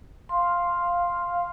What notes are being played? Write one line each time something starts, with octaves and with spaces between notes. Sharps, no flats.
F5 C6